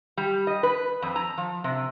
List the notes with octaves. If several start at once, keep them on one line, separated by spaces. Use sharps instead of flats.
G3
D#5
B4
F2
A#5
F3
C3